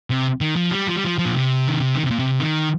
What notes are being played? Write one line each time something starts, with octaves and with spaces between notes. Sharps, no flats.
C3
D#3
F3
G3
F3
G3
F3
F3
A#2
C3
D#3
C3
D#3
C3
A#2
C3
D#3